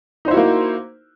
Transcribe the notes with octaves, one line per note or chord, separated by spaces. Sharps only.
A#3 D#4 E4 F#4 C5